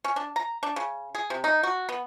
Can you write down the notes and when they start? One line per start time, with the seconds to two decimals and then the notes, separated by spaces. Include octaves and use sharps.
0.04 C#4
0.16 D4
0.36 A#5
0.63 D4
0.76 C#3
1.15 G#4
1.30 C3
1.44 D#4
1.63 F#4
1.89 B3